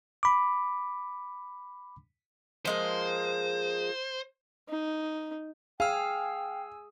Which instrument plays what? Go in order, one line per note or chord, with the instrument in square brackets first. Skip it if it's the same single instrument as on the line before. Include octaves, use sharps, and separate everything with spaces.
[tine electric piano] B5 D6
[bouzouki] F3 G#3 A#3 [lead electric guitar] C5
[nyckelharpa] D#4
[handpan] G#4 [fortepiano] F5 [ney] G5 [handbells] G#5 E6